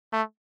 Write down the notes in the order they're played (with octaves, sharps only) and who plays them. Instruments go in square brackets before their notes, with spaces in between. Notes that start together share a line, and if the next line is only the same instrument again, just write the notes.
[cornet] A3